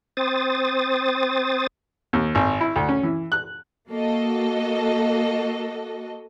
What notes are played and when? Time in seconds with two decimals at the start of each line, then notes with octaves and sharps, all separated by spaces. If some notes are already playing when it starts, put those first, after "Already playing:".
0.17 C4 C5 D#6 A6
2.13 D#2
2.35 G#1
2.61 E4
2.76 D2
2.89 C#4
3.03 E3
3.32 F#6
3.89 A#3 F#4 A4 D#5